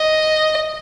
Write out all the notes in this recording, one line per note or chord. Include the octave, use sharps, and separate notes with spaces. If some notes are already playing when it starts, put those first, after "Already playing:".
Already playing: D#5